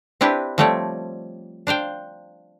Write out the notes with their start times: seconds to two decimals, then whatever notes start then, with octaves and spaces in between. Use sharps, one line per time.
0.21 C4 D4 E4 G4 B4
0.58 F3 G3 A3 C4 C#5 D5
1.67 D4 C5 F5 G5